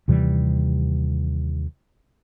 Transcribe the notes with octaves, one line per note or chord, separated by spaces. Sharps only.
D#2 C3 E3 G3